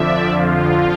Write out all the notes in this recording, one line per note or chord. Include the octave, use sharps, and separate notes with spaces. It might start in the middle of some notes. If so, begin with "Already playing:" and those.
Already playing: F2 D3 F3 D5 E5
F2 D3 F3 F4